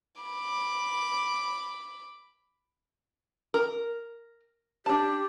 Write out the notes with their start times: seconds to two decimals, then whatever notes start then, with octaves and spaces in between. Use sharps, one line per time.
0.22 B5 D6
3.54 A#4
4.86 D4 G4 A5